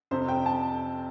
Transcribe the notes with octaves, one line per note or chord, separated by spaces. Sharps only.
F2 C3 C5
G5
A5